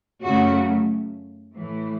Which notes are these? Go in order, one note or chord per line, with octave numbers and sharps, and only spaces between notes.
F#2 C#3 A3 F#4
A2 E3 A3